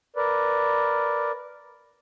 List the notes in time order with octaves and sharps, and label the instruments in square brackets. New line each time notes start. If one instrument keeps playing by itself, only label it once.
[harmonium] A#4 B4 D5